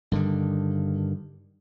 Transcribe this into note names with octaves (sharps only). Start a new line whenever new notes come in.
G2 D3 D#3